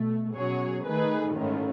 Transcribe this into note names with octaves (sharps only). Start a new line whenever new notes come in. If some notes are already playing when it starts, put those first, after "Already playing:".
Already playing: B2 A3
B2 F#3 C#4 G#4 C#5
D#3 A3 D#4 G#4 B4
A1 G#2 D#3 A3 C#4